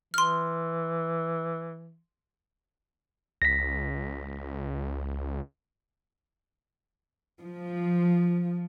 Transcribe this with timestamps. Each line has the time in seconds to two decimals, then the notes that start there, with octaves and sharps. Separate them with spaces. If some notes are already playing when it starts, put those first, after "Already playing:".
0.14 E3 C6 F6
3.42 C#2 A#6 B6
7.41 F3